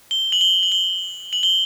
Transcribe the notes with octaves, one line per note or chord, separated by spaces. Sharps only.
G7
F#7
G7
F#7
G7
F#7
G7